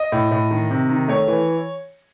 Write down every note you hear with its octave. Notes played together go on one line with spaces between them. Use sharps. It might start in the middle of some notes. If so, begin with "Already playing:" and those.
Already playing: D#5
A2
A2
D#3
C3
D#3
A3 C#5
E3